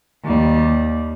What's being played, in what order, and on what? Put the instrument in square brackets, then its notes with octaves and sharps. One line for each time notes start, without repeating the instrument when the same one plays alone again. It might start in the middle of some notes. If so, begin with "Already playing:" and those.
[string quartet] D#2 G3